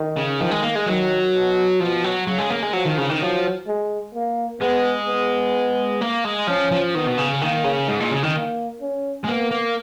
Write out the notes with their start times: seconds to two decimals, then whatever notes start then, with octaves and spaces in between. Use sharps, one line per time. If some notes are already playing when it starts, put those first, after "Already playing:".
Already playing: D#3
0.17 C#3
0.39 D#3 F3
0.51 G#3
0.63 A#3
0.75 G#3
0.86 D#3 F#3
1.34 B2
1.80 B2 F3
2.04 F#3
2.26 C#3 F#3
2.38 G#3
2.50 A#3
2.63 G#3
2.73 F3 F#3
2.85 D#3
2.98 C#3
3.09 D#3
3.20 F3 F#3
3.67 G#3
4.14 A#3
4.61 G#3 B3
5.07 B3
6.01 A#3
6.24 G#3
6.47 F3 C#4
6.71 F3
6.95 D#3 B3
7.07 B2
7.17 C#3
7.42 D#3 A#3
7.64 C#3
7.87 G#2 G#3
8.00 A#2
8.11 C#3
8.23 D#3
8.35 A#3
8.81 C#4
9.24 G#3
9.28 A#3 B3
9.51 A#3